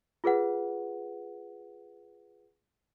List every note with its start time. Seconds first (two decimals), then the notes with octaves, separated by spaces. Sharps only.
0.24 F4 G#4 B4 F#5